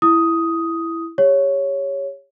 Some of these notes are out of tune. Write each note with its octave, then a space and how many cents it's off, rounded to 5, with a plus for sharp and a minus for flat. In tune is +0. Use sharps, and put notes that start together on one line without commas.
E4 +5 D#6 +5
G4 +35 C#5 +0